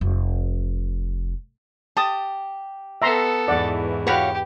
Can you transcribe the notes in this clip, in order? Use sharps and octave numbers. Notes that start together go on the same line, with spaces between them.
F1
G4 A5 D#6
B3 A4 E5 A#5 C6
E2 G#2 E3 D5 F#5
F#4 G4 B4 C#5 F5 B5